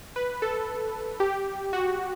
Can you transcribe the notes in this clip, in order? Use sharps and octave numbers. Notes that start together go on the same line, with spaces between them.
B4
A4
G4
F#4